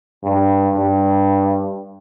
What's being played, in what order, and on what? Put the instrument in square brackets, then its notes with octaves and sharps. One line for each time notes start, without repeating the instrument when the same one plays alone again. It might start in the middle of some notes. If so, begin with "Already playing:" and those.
[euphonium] G2
G2